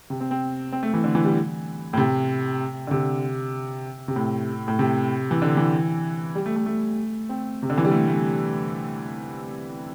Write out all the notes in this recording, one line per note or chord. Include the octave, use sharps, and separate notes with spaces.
C3
C4
C4
C4
A3
E3
D3
E3
G3
A2
C3
D3
C3
C3
A2
A2
C3
E3
D3
E3
G3
A3
A3
A3
C4
C3
D3
E3
G3
A3
A3